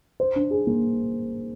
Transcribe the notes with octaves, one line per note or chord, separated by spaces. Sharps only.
C5
D4
G#4
A#3